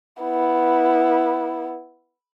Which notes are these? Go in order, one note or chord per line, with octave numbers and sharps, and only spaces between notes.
B3 E4